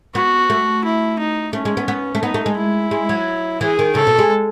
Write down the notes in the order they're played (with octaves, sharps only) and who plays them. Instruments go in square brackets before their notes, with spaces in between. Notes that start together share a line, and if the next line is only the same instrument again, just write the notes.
[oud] B3 [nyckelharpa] F#4
[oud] A3
[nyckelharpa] E4
D#4
[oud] A3 [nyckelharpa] C#4
[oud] G#3
B3
B3
A3
[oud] B3 [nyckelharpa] D#4
[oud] A3
G#3
[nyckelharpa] E4
[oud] G#3
F#3
[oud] E3 [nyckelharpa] G#4
[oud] D#3
[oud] C#3 [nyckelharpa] A4
[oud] B2
G#3